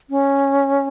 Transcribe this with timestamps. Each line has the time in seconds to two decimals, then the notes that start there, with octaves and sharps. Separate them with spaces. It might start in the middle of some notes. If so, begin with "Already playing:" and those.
0.10 C#4